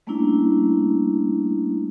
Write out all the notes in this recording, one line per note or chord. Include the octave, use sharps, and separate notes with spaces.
G3 A3 A#3 C#4 D4 E4